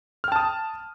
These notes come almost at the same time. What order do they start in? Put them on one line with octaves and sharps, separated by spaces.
F6 G5 A5 D#6